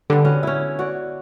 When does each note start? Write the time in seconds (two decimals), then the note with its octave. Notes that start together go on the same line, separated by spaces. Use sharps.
0.10 D3 G3 B3
0.25 C#4 F#4
0.43 C#4 E4
0.79 F#4 D5